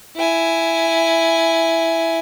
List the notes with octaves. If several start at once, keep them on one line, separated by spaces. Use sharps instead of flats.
E4 G#5